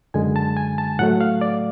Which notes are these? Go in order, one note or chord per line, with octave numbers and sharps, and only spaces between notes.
F#2 D3 G#3 G#5
A5
G#5
A5
A2 F#3 A3 F#5
F5
D5